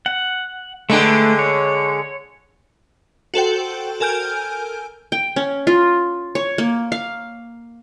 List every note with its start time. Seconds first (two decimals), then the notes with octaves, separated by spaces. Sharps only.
0.06 F#5
0.90 D3 G#3 A3 B4 G5
1.39 C#5
3.34 F#4 A4 C5 G5
4.00 A4 A#4 G#5 F6 G6 D7
5.12 G5
5.36 C#4
5.67 F4
6.35 C#5
6.58 A#3
6.92 F5